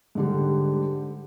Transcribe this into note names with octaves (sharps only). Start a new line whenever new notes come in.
G#2 D3 G3